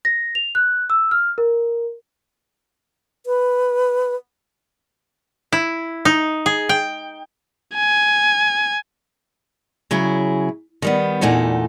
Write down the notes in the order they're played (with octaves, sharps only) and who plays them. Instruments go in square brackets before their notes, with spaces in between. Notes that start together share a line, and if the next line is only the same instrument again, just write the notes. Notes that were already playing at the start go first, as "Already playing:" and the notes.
[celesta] A#6
F7
F#6
E6
F6
A#4
[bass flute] B4
[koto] E4
D#4
G#4
G5
[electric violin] G#5
[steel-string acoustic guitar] C#3 F#3 E4 G#4
D#3 G3 B3
E2 A#2 A3 D#4 F#5